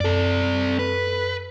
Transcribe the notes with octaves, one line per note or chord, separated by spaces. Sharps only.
F#2 C4 A4 D5
B4